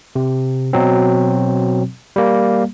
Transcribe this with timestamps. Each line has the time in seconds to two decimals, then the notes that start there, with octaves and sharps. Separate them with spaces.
0.16 C3
0.73 B2 F#3 C4
2.16 G3 A#3